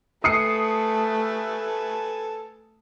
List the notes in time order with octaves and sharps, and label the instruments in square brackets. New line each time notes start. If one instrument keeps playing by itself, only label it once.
[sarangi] A3 [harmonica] A4 B4 G#5 [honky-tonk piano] D#6 C7 C#7